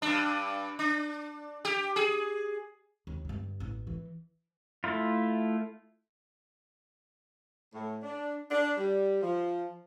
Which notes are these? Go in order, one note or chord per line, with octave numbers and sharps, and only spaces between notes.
G2 D4
D4
G4
G#4
D#2
G2 D3
A1
E3
A3 E4 F4
A2
D4
D4
G3
F3